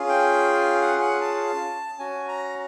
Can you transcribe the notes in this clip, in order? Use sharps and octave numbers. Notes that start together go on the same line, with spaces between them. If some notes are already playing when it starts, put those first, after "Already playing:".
Already playing: C#4 F4 G#4
G5
F#5
F#5
A5
C#4 F#4 G#5
A#5